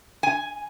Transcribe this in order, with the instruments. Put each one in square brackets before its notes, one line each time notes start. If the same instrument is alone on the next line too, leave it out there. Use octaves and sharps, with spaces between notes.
[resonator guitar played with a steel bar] G#5